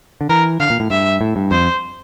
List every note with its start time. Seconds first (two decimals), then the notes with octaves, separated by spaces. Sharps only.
0.21 D3
0.29 E3 A#4
0.60 D3 F5
0.70 A#2
0.80 A2
0.90 G2 E5
1.21 A2
1.36 G2
1.51 F2 C5